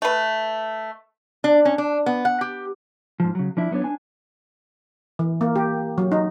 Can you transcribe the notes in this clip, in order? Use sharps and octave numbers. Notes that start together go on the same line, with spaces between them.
A3 B4
D4
C#4
D4
B3
F#5
G4
G#2 F3
C#3 F#3
F3 D4 E4
F#3 B3 C4 D4 C#5
D4 G#5
E3
A#3
G4
F#3
D#4